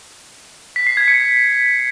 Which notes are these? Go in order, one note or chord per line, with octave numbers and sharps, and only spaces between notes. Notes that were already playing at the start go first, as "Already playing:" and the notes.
B6
C7
G#6
C#7